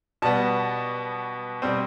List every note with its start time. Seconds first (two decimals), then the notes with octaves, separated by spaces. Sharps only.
0.22 B2 G3 B3 A5
1.62 B2 G3 C4